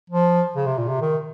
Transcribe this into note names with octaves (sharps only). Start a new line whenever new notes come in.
F3
C#3
C3
A#2
C3
D#3